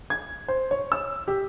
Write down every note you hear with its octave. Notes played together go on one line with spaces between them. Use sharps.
G#6
C5
C#5
E6
G4